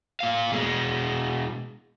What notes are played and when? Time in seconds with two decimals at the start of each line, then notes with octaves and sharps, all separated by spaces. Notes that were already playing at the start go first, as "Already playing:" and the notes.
0.21 A#2 F5
0.52 B2 G#3